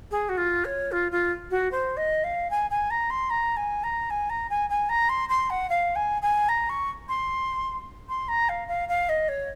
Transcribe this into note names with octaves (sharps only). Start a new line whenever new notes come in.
G#4
F#4
F4
C#5
F4
F4
F#4
C5
D#5
F5
G#5
G#5
A#5
C6
A#5
G#5
A#5
G#5
A#5
G#5
G#5
A#5
C6
C6
F#5
F5
G#5
G#5
A#5
C#6
C6
C6
A#5
F5
F5
F5
D#5
C#5